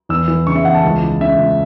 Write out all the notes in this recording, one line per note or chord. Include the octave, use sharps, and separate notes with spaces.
E2 E6
E3
C#3 C#6
E5
E2 F#5
A5
C#2
E3
C#3 E5
C#2